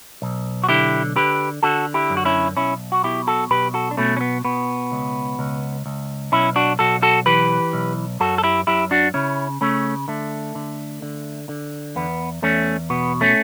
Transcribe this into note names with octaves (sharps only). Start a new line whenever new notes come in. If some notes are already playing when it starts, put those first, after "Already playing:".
B1
F#4
D3 E4 G4
D3 G4 B4
D3 F#4 A4
E4 G4
F#2
F#4
C#4 E4
B1 C#4 E4
F#4
B2 E4 G4
F#4 A4
B1 G4 B4
F#4 A4
D4
B2 A3 C#4
C#4
B3
B2 B3
C#2
C#2
C#2
B1 C#4 E4
D4 F#4
B1 F#4 A4
F#4 A4
E3 G4 B4
B1
F#2 F#4 A4
A4
E4 G4
F#2 E4 G4
D4 F#4
C#3 C#4 E4
C#3 A3 C#4
D3 A3
D3
D3
D3
E2 B3
E2 A3 C#4
B2 B3
A3 C#4